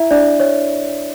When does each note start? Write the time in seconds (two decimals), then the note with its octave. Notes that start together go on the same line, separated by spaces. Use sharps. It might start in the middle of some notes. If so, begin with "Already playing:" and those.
Already playing: E4 E5
0.11 D4 D5
0.40 C#5